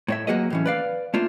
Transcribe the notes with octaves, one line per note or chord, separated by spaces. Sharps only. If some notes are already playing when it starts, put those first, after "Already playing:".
A2 C#5 E5
F#3 A#3 F#4 G#4 B4 D#5
A2 E3 C#4
B4 D5 F5
A3 A#3 D4 F4